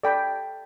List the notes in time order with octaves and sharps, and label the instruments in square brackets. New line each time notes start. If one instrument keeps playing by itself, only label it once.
[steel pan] A4 D5 G5 B5